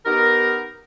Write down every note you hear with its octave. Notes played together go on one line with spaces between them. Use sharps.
B3 D#4 G4 A#4